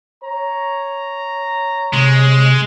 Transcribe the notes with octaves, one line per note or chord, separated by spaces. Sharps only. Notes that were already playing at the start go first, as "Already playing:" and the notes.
C#5 A#5
C3 G#3